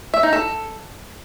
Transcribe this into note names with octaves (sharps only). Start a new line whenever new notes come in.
E5
D#4
A4